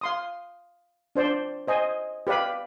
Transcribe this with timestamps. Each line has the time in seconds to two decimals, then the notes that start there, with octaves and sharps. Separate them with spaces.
0.01 F5 C6 D#6
1.15 D4 C5 D5
1.67 C5 D#5 G#5
2.27 G4 B4 D5 F5 B5